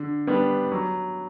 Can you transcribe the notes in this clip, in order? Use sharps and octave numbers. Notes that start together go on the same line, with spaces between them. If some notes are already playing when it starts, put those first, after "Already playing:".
Already playing: D3
G3 B3 D4 G4
F#3